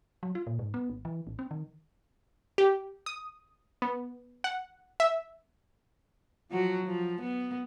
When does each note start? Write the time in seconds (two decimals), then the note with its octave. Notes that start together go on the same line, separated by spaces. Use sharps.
0.23 F#3
0.35 F4
0.47 A#2
0.59 G#2
0.74 B3
0.90 G#1
1.05 E3
1.27 A1
1.39 C4
1.51 D#3
2.58 G4
3.06 D#6
3.82 B3
4.44 F#5
5.00 E5
6.50 F3 F#3 F#4
6.85 F3
7.21 B3